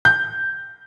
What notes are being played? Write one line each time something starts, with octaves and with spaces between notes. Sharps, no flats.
G6